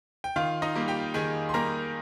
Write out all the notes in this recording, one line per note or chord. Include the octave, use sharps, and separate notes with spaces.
G5
D#3 F4 F5
D#4 D#5
G3 A#3
G4 G5
D#3 G#4 G#5
C6
G3 A#3 A#4 A#5